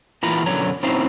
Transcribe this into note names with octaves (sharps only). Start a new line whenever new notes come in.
E2 A#2 E3 F4 A#5 B5
F#2 B2 D3 C#5 A#5
C4 C#4 D#4 E4 C5 F5